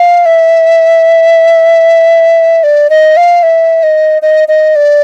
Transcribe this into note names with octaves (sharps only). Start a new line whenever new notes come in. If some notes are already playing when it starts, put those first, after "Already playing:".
Already playing: F5
E5
D5
D#5
F5
E5
D#5
D#5
D#5
D5